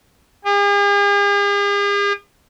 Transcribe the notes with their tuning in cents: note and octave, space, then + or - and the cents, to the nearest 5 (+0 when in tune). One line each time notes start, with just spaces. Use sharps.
G#4 -45